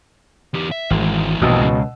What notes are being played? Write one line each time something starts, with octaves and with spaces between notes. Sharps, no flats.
E2 G4
E5
G#1 G#2 E3
A#1 F2 B2 D#6 E6
C#2